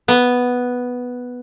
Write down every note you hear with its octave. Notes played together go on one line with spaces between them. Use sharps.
B3